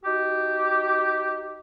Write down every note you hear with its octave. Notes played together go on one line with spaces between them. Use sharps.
D#4 F#4 G4